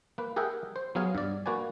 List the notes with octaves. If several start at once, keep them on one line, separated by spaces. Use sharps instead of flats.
A#3 B4
G4 G#4 A#4 E5 F#5 G5
C5
F#3 B3 G#4 F5 G#5
G2 D5
A#3 F#4 B4 D5 G#5